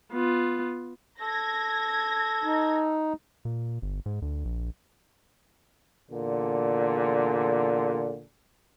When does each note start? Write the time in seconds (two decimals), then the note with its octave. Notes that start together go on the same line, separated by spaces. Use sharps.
0.13 B3 F4
1.21 A4 G#6 A#6
2.44 D#4
3.45 A#2
3.82 G1
4.06 G#2
4.22 D2
4.45 A#1
6.11 E2 A#2 D3